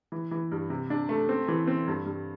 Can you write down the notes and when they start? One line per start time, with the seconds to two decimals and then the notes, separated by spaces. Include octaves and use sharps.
0.12 E3
0.31 E3
0.52 G2
0.70 C3
0.90 D4
1.09 A3
1.29 C4
1.48 E3
1.67 C4
1.88 G2
2.06 G2